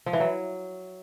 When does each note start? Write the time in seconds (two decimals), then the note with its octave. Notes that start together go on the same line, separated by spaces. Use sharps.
0.06 F3
0.13 E3
0.20 F#3